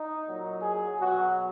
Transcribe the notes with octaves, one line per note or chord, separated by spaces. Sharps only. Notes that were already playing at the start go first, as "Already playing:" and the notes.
Already playing: D#4
A#2 F#3
G#4
B2 F#3 F#4